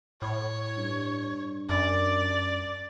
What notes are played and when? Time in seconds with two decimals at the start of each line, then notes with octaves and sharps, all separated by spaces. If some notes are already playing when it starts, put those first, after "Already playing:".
0.22 A2 C#5
0.77 G2
1.69 F#2 D5